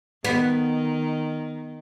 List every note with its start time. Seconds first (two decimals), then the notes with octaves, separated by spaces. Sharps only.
0.25 D#3 B3